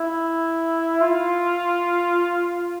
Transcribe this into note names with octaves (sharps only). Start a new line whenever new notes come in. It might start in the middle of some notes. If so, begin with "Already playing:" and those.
Already playing: E4
F4